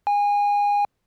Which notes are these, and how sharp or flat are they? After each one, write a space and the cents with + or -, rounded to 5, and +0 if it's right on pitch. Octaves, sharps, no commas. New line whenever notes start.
G#5 -25